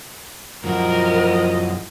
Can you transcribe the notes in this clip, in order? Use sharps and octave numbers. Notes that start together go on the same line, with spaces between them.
F#2 E3 F3 F#4 A#4 D#5